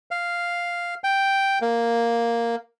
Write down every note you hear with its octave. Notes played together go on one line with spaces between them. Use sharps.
F5
G5
A#3